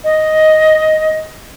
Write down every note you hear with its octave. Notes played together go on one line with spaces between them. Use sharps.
D#5